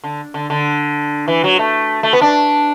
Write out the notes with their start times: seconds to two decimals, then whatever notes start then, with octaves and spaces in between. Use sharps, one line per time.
0.04 D3
0.34 D3
0.50 D3
1.28 E3
1.44 F#3
1.59 A3
2.03 A3
2.13 B3
2.22 D4